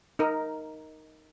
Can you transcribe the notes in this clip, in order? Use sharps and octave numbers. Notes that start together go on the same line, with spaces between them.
D#4 A#4